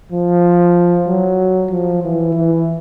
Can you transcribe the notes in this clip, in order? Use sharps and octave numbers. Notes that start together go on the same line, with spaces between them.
F3
F#3
F3
E3
E3